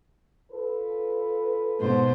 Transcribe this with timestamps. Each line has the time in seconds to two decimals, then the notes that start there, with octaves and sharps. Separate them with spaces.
0.52 F4 A4 B4
1.80 G#2 B2 C5